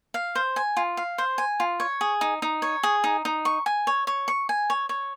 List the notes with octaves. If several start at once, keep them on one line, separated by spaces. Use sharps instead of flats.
F5
C5
G#5
F4
F5
C5
G#5
F4
C#5
G#4
D#4
D#4
C#5
G#4
D#4
D#4
C#6
G#5
C#5
C#5
C#6
G#5
C#5
C#5